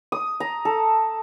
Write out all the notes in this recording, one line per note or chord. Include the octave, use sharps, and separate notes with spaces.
D#6
A#5
A4